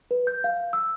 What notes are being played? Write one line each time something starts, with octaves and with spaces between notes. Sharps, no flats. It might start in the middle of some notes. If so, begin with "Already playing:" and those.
B4
G6
F5
E6